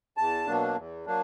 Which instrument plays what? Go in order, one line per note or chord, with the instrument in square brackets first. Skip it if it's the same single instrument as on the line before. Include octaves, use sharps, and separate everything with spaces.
[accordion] E2 A5
B2 F#3 A#3 D4
E2
F#3 A#3 D4